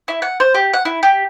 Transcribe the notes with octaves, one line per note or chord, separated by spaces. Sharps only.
E4
F#5
C5
G4
F#5
E4
G4